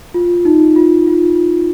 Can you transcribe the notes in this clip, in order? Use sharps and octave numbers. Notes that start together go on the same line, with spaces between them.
F4
D#4
F4
F4